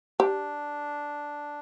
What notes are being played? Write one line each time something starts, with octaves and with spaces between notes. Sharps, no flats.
D4 G4